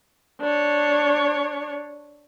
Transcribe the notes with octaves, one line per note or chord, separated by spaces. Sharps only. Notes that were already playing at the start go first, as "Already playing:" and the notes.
D4 C#5